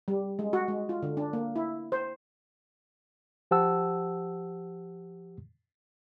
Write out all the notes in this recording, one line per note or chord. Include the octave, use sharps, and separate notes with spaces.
G3
G#3
F#4
G#3
F4
D3
D4
A#3
E4
C5
F3 G4 C5 F#5 A5 E6